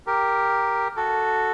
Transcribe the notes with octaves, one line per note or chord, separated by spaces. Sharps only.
G4 A#4
F#4 A4